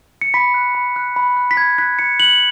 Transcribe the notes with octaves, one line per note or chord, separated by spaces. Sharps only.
C#7
B5 B6
F#6
B5
F#6
B5
F#6
B6
B5 G#6
F#6 B6
B5 C#7
F#6 F#7